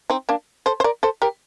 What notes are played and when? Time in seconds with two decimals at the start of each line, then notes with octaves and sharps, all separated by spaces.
0.10 C4 D#4
0.29 A#3 D4
0.66 A4 C5
0.80 C5
0.84 A#4 D5
1.03 A4 C5
1.22 G4 A#4